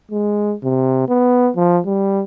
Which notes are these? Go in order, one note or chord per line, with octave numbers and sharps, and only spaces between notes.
G#3
C3
B3
F3
G3